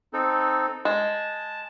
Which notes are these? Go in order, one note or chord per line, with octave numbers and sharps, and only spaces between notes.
C4 D#4 A4
G#3 A5